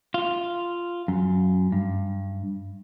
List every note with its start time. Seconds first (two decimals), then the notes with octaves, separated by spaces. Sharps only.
0.14 F4
1.08 F#2
1.72 G2